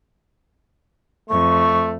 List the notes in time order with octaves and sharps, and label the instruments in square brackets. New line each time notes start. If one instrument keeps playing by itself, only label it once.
[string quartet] F2 [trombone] A3 [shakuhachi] C#6